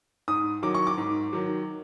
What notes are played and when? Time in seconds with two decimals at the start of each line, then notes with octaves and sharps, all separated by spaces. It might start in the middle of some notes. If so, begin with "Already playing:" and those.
0.28 G#2 D#6
0.63 D#3 F#3 D6
0.74 C#6
0.87 D6
0.98 G#2
1.33 D#3 F#3